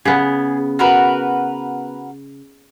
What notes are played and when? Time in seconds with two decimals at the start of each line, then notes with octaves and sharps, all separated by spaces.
0.05 C#3 B3 G#4
0.79 F#4 A#4 B4